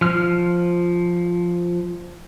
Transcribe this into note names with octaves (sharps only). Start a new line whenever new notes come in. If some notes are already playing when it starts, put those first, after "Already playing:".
F3 F6